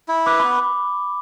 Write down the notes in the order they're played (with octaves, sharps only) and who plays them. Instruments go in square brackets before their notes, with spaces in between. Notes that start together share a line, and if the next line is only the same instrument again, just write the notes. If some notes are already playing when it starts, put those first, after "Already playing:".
[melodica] E4
[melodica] B4 [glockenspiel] D6
[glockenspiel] B5
[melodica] B3